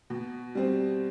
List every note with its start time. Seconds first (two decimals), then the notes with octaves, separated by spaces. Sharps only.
0.10 B2
0.55 G3 C4